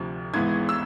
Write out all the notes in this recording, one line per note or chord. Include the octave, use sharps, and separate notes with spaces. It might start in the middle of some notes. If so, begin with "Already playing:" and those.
Already playing: D2 C3 F3
G#1 G#2 E3 G#3 B3 G#6
E6